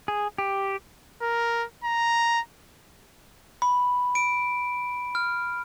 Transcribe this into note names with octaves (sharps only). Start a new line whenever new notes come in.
G#4
G4
A#4
A#5
B5
D7
F6